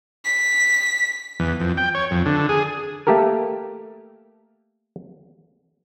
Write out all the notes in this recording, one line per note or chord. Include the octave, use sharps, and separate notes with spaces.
B6
E2
F2
G5
C#5
F2
D3
G#4
A3 A#3 G4 A4 A#4